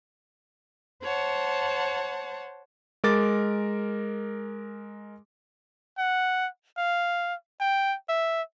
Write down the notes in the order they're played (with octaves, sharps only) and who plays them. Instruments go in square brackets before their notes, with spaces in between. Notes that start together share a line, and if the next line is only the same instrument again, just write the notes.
[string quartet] C5 C#5 F#5 A5
[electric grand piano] G#3 A#4 D6 A6
[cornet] F#5
F5
G5
E5